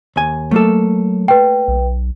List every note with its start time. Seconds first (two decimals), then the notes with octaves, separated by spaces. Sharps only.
0.16 D#2 G#5
0.51 F#3 A3 A#3 A4
1.28 B4 G5
1.68 B1